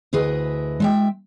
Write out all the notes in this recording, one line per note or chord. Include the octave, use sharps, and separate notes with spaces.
D2 E4 G#4 B4 D#5
G#3 E5 G5